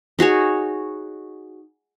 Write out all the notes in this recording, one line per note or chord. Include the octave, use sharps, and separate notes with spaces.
D#4 F#4 G#4 C#5